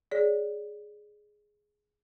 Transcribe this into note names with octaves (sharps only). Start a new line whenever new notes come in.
G#4 C#5 D5